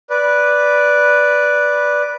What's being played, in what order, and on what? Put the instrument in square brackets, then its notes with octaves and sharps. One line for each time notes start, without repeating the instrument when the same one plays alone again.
[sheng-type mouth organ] B4 D5